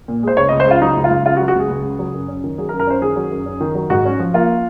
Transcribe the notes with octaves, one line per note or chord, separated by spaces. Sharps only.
A#2
G#3 C5
C#2 C#5
D#5
C#2
C5
C#3 F4
F#3 D#4
C#2
F4
C#2
C#3 F4
F#4
F#3
F#4
C#2 G#4
C#2
C#3
F#3
F#2
C#4
D#3
F#3 G#4
A#4
F#2
A#4
C#4 C5
D#3 G#4
F#3
F#2
C#4
D#3
F#3
G#2 F#4
C#4
F3
A#3 F4